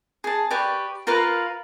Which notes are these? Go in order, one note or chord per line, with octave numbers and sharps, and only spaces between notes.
G#4 A5
G4 B4 D5 C#6
F4 A#4 B4 F5